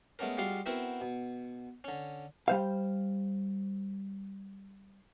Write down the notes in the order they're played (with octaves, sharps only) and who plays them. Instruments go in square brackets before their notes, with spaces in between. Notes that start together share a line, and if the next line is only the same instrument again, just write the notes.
[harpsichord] G#3 A3 B3 C#4 A#4
G3 G#3 F4 F#4 F5
B3 C4 E4 F#4 A#4 B4
B2
D3 C#4
[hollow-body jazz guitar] G3 C5 F5